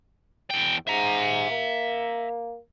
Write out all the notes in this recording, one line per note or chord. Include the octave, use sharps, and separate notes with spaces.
E2 G5
G#2 E5 A#5
A#3